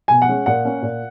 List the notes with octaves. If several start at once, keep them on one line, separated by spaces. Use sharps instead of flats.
B2 G#5
F#5
G#3 C#4
A#2 F#5
A#3 C#4
A#2